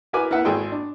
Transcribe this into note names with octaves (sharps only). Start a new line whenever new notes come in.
E4 F#4 A#4 B4 G#5 D6
E4 A#4 B4 E5 F#5
G#1 G#4 A4 D#5 G5 C6
D4